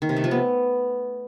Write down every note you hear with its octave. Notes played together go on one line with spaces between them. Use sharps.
D#3
C3
A3
F3
B3